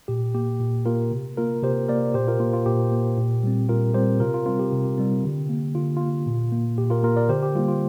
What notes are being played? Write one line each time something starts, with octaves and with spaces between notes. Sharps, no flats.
A#2 G4
A#3 G4
A#2
A#3 F4 A#4
C3
A#3 F4 A#4
C3 G4 C5
A#3 A#4 D5
A#2 G4 C5
F4 A#4
A#3 F4
F4
A#2 G4
A#3
A#2
G3 C4
A#2 F4 A#4
G3 C4 G4 C5
C3 F4 A#4
F4
G3 C4 F4
G4
C3
G3 C4
D3
A#3
D3 F4
A#3 F4
A#2
A#3
A#2 G4
F4 A#4
A#3 F4 A#4
A#4 D5
D3 G4 C5
G4
G3 A#3 F4
F4